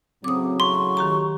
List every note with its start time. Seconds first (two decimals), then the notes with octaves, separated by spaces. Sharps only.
0.24 A2 C#3 F#3 C4 D6 D#6
0.60 C6 C#6
0.97 D#3 G4 A#5